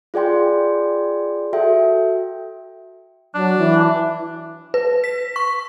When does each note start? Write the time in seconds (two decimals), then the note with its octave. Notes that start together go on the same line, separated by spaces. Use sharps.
0.14 F4 G#4 D5 G5 C6
1.53 F#4 A4 E5 G5
3.34 F#3 D4
3.58 E3
4.74 B4
5.04 B6
5.36 C#6